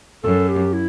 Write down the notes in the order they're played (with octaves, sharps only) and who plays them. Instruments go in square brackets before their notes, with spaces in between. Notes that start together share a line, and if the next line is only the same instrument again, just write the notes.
[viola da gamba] F#2 [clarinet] A4
[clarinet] G4
E4